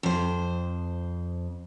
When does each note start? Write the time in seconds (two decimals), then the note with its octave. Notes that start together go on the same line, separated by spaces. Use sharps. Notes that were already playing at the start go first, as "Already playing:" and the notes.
0.03 F2 C5